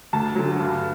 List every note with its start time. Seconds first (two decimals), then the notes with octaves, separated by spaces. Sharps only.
0.13 D2 A5
0.36 D3 F#3
0.59 G2